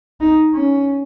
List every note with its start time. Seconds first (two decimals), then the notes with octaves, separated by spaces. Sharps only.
0.20 D#4
0.54 C#4